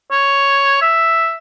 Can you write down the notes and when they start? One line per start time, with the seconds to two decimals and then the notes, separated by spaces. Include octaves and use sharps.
0.11 C#5
0.82 E5